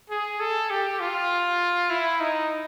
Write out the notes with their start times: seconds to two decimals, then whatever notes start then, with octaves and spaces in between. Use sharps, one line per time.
0.10 G#4
0.40 A4
0.70 G4
1.00 F4
1.90 E4
2.20 D#4